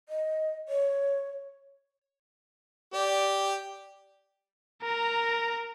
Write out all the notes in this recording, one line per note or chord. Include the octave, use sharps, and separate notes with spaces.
D#5
C#5
G4 D5
A#4 A#5